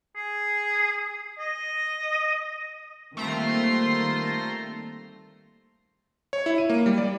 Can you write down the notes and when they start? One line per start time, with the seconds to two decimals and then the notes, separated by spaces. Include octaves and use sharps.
0.16 G#4
1.39 D#5
3.17 D#3 G3 A3 A#3 C4 F4 A#5 C6
6.33 C#5
6.46 E4
6.58 D#7
6.69 A#3
6.86 G3
6.98 D5